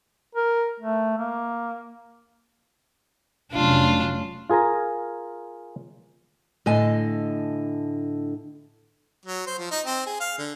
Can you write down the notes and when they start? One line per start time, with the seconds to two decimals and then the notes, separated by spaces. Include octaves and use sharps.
0.35 A#4
0.80 A3
1.18 A#3
3.53 F1 F#3 C#4 D4 F4
4.50 F4 G#4 A#4 G#5 A#5
6.66 A2 D3 D#5 G#5 A5
9.25 F#3
9.46 C5
9.59 F3
9.71 D#4
9.86 C4
10.06 G#4
10.20 F5
10.38 D3